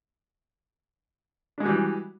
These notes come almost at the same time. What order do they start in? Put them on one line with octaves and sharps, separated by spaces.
D4 G#3 F#4 G3 E3